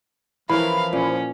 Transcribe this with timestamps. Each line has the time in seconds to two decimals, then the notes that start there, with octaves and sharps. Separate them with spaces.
0.50 E3 F3 C#4 A#4 F5 B5
0.93 A#2 C#4